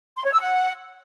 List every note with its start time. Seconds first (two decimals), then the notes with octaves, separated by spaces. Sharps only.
0.16 C6
0.24 C#5
0.32 E6
0.40 F#5